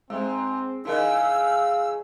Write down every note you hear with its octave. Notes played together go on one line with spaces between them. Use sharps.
G#2 G#3 C4
C#3 E3 G#3 D#4 A#4 D#5 F5 E6